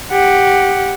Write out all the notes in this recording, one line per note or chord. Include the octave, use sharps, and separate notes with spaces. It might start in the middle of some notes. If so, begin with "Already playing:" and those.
G4 F#5